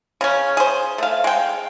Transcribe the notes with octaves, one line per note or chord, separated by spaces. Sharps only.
C#3 C#4
G#4 C5
A3 F5
G#3 G5